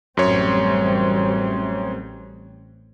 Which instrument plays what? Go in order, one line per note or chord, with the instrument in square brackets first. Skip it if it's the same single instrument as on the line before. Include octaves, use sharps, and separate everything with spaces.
[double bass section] A1 G3 C4 [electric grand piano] F#2 C#5